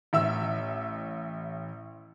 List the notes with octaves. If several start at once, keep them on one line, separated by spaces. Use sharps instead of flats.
A1 E5 E6